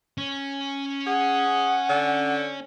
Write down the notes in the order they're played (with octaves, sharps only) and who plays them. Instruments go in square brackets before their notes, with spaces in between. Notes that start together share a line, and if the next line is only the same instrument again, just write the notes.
[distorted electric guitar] C#4
[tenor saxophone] G#4 [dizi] F#5
[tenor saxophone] D3